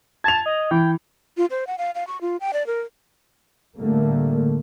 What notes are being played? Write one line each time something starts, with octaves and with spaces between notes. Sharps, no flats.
A5 G#6 F7
D#5
E3 G5
F4
C5
F#5
F5
F5
C#6
F4
G5
D5
A#4
A2 D3 G3 A3 A#3